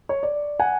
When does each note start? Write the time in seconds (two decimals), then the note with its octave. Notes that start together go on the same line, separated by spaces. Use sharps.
0.09 C#5
0.23 D5
0.60 F#5 G#5